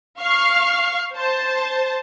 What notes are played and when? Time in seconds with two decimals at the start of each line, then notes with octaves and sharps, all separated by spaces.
0.19 F5 C#6 F6 C7
1.14 C5 A5